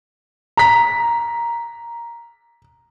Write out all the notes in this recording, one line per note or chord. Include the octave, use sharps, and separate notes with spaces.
A#5 B6